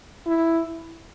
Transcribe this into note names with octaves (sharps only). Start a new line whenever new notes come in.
E4